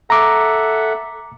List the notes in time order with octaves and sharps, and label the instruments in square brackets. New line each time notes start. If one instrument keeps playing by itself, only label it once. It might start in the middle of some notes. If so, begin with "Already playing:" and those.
[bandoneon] A4 E5 F#5 [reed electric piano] A#5 D6